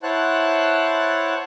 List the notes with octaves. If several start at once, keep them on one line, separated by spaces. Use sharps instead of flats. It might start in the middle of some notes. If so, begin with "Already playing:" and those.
E4 C5 C#5 F#5 A5 F#6